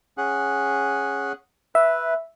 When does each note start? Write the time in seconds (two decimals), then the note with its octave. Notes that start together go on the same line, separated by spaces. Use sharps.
0.18 C#4 G#4 F#5
1.75 B4 E5